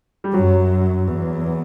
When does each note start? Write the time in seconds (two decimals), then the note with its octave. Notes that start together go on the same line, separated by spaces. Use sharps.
0.24 G3
0.34 F#2 F#3
1.07 E2